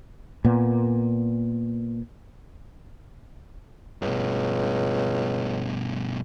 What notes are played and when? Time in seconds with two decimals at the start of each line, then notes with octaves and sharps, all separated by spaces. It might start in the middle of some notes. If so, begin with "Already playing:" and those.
0.45 A#2 B3
4.02 C#2 G2 B2